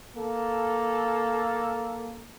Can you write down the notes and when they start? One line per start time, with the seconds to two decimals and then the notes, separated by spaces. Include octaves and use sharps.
0.16 A#3 A4